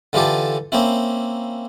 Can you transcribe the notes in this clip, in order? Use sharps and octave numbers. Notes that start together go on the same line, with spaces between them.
D3 E3 F4 G4 A4
A#3 C4 C#4 E4